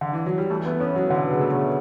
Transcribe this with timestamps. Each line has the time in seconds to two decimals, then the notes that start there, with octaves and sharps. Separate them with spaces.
0.01 D3
0.13 E3
0.26 F#3
0.38 G3
0.50 E3 A3
0.66 B3
0.80 B3 C#4
0.96 F#3
1.10 B2 D3
1.31 C#3
1.41 A3
1.50 C#3